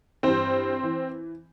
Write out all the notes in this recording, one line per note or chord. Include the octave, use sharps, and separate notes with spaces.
G2 E3 C4 C5
E3